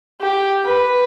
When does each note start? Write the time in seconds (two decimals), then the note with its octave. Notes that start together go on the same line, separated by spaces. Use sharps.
0.21 G4
0.65 B4